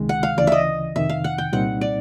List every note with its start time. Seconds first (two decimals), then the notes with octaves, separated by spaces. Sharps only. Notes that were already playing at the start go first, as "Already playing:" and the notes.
Already playing: C#2 C3 D#3 G#3
0.09 F#5
0.23 F5
0.37 D2 C#3 E3 D5
0.47 D#5 E5
0.95 F2 C3 D#3 E5
1.09 F5
1.24 F#5
1.38 G5
1.52 C2 A#2 G3 C4 D#4 F#5
1.81 D5